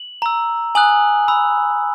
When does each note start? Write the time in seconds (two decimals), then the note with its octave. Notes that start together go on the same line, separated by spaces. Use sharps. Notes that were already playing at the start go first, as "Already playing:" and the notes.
Already playing: F#7
0.22 A#5 E6
0.75 G#5 D#6 F#6 F#7
1.28 B5 E6